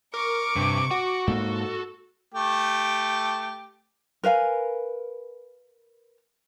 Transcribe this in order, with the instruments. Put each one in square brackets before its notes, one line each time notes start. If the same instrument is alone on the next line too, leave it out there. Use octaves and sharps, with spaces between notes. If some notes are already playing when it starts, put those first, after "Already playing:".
[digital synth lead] A#4 [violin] C#6 D6
[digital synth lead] G2 [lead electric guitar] C3
[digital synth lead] F#4 [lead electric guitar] F#5
[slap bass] G#2 A#3 [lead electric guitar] A4
[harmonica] A3 G4
[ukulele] A#4 B4 F5 G#5